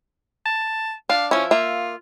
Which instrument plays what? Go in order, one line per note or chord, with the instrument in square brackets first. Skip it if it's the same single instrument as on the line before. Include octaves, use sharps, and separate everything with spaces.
[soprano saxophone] A5
[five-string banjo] D4 [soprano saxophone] F5
[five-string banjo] F3 E4 [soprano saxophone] C#4
[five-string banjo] A#3 E5 [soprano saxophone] F4